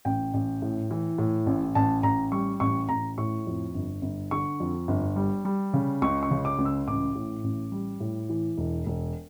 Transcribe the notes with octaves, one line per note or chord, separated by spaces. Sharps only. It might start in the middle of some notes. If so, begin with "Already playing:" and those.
A1 G5
A1
A2
E3
A2
A1
A1 A5
A1 A#5
G3 C#6
A1 C#6
A1 A#5
A2 C#6
F2
G1
G1
D3 C#6
F2
G1
G3
G3
C#3
C#2 C#6
C#6
C#3
D6
C#2
E6
A1 D6
A2
A1
G3
A2
E3
E1
E1